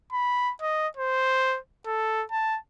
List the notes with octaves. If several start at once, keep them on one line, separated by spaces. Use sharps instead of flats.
B5
D#5
C5
A4
A5